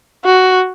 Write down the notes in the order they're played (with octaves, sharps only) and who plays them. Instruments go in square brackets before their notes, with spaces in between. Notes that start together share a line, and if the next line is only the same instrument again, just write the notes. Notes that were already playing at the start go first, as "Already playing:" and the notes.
[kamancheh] F#4